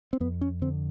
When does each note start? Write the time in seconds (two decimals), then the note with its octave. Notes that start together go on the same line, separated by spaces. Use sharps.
0.13 C4
0.20 F2 B3
0.41 C#4
0.62 D3 C4